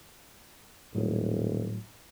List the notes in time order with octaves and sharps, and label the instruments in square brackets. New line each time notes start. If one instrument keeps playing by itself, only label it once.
[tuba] D#1 [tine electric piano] A2 F#3